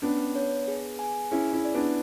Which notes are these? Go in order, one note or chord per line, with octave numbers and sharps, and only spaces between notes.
B3 C#4 D4
C#5
G#4
G#5
C#4 E4 G#4
C#4 E4
D5
B3 D4